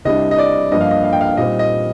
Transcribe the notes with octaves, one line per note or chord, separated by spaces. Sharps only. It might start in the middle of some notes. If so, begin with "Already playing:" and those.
C2 C3 G3 D4 D#5
D#5
D5
G2 F3 A#3 D#5
F5
D#5
F5
G5
F5
A#2 G3 C4 D#4 D#5
D#5